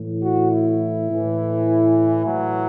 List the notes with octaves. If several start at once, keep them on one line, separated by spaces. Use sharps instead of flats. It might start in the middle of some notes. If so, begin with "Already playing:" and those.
Already playing: A2 E3
F#4
E4
A2 E3
A2 E3 F#3